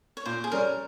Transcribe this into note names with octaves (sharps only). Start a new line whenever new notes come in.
C#5
A#2 C5
G#4
G3 C#4 A#4